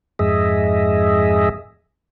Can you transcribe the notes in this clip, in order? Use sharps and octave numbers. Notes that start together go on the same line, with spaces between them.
F2 G#2 G#4 D#5 E5